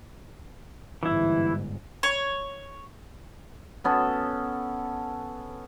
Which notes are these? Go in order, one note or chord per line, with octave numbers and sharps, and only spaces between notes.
G1 G#2 E3 E4
C#5
B3 C#4 A4